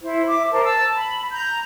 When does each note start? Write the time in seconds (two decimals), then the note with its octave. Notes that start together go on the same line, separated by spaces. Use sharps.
0.01 E4 C5
0.28 E5 D6
0.51 A#4 C5 A5
0.64 A5 E6
0.94 B5
1.32 A#5 G6